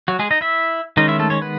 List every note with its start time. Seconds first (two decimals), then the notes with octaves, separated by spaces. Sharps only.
0.08 F#3 F#4
0.19 G#3 G#4
0.31 D#4 D#5
0.41 E4 E5
0.97 D#3 G#3 C#4 D#4 D#5
1.08 E4 E5
1.19 A3 A4
1.30 C#4 C#5
1.42 B3 B4